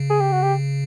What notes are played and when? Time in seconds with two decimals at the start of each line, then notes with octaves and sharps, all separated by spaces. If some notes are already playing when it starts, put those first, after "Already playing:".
Already playing: C#3
0.10 G#4
0.20 G4
0.32 F#4
0.42 G4